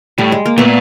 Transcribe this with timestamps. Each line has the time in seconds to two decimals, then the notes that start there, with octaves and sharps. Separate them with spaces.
0.18 A2 G3
0.32 G#3
0.46 A#3
0.58 A#2 A3 B3